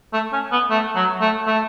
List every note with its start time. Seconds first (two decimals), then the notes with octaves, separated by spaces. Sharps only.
0.13 A3
0.32 C#4
0.52 B3
0.70 A3
0.96 F#3
1.21 A3
1.47 A3